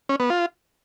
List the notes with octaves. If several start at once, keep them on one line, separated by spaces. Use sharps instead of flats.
C#4
B3
F4